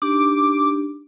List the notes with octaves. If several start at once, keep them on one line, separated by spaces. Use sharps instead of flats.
D4 D#4 G4 D6